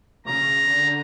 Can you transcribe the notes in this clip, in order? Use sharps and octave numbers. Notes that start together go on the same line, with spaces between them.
C#3 A#5
D3